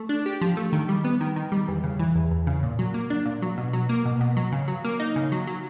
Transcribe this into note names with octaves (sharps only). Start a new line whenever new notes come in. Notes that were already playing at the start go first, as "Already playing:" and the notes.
Already playing: A3
D4
G4
F3
A3
D#3
G3
B3
D#3
D#3
G3
E2
C#3
E3
E2
E2
C#3
A#2
F#3
A#3
D4
A#2
F#3
B2
F#3
A#3
B2
B2
F#3
C#3
F#3
A#3
D#4
C#3
F#3
F#3